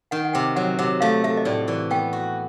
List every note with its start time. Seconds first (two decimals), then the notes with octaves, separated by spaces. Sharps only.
0.11 D#3 F#5
0.25 F#5
0.33 C3 G5
0.56 F#3 F#5
0.79 C3 F#5
1.01 A3 F5
1.24 A3 E5
1.37 D#5
1.45 A2 D5
1.68 E3 D5
1.91 B3 G5
2.13 F#4